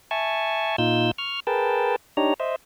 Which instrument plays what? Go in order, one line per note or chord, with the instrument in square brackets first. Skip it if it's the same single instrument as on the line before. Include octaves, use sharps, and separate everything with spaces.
[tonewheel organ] E5 G#5 A5 C#6
A#2 D#4 F4 E6 G6
C#6 F6
G#4 A#4 B4 G5 A5
D4 D#4 G4 C#5 A#5
C5 D#5 E5